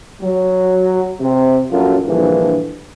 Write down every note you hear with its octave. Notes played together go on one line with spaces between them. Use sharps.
F#3
C3
A#1 F#2 F#3 F4 A4
A#1 G2 D3 E3 F3